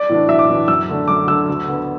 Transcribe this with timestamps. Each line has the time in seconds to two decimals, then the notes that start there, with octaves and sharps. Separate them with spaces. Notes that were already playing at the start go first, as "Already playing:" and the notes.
Already playing: D5
0.09 A2 E3 D4
0.28 B1 E5
0.39 D6
0.49 A2 E3 D4
0.68 F#2 E6
0.89 D3 A3 D4
1.08 F#2 D6
1.27 D3 A3 D4 E6
1.48 D2
1.68 D3 B3